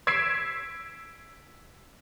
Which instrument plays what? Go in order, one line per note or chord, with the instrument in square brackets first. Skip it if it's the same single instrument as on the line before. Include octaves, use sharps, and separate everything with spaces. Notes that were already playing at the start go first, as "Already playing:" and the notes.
[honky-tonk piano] E6 G#6 B6 C7 D7 E7